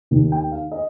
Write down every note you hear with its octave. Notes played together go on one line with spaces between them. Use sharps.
D#2 D#3
G5
F5
D#5